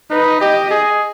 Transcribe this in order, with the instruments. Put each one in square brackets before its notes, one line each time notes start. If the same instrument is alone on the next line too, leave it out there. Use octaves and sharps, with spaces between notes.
[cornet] D#4 [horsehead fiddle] B4
[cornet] G4 [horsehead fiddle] D#5
[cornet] G#4